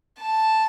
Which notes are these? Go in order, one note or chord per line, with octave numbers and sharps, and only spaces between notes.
A5